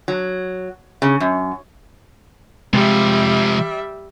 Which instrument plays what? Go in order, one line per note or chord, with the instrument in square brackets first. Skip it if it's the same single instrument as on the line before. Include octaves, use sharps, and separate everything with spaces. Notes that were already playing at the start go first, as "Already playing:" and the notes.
[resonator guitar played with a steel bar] F#3
C#3
F#2
[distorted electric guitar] C3 F3 [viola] G3 E5 [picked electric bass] G#3